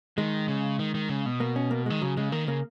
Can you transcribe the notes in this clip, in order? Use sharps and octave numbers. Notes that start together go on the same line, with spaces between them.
D#3 G#3
C#3
D#3
D#3
C#3
B2
A#3
C#4
A#3
D#3 G#3
C#3 F#3
C#3 G#3
D#3 A#3
C#3 A#3